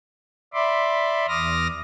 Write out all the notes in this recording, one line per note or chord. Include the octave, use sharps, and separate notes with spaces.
D5 E5 B5 C6 D6
E2 D6 D#6 F6 A#6